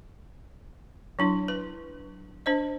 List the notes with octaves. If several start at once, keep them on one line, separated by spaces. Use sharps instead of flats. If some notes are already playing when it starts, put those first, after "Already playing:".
F#3 D4 E4
B4
D4 C5 D#5